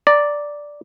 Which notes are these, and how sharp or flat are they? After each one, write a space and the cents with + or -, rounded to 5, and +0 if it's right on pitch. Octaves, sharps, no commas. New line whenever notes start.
D5 +0 A#5 +0